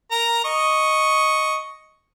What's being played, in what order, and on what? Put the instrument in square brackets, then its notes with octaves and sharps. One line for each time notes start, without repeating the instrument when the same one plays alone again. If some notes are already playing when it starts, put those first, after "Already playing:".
[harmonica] A#4 A#5
D#5 C#6